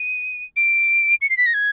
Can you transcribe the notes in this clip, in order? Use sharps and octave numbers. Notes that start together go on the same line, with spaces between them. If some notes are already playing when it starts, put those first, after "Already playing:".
Already playing: D#7
D7
C#7
C7
B6
A#6
G#6